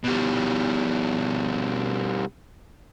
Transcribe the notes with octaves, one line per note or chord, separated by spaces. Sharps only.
B2 G3